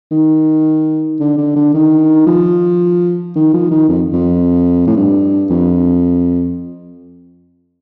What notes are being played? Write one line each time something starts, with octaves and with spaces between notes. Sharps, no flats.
D#3
D3
D3
D3
D#3
F3
D#3
F3
D#3
F2
F2
A2
G2
F2